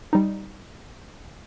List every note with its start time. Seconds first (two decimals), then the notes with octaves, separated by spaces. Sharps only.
0.13 G3 D#4